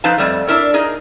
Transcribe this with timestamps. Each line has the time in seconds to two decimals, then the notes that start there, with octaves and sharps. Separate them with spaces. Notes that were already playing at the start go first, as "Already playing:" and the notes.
0.04 F3 D#4 B4 F5 A5
0.18 F2 G3 A3
0.47 D4 E4 A#4 C#5
0.74 D#4 G#4 A#4